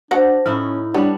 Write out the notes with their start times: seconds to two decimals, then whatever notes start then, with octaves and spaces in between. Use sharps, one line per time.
0.11 D4 F#4 C5 D5 F#5 A5 A#6
0.46 A2 C#4 D#4 E4 F6
0.94 G3 B3 D4 C#5